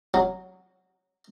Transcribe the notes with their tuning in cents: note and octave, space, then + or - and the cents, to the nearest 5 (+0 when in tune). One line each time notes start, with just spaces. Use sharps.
F#3 +5